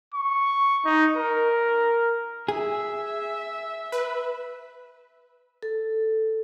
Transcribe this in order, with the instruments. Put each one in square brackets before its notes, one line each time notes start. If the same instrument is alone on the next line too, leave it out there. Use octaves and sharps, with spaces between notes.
[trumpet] C#6
D#4
A#4
[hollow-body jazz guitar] G#4 [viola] E5
[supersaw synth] B4
[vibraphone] A4